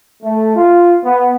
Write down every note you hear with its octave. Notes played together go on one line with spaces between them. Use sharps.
A3
F4
B3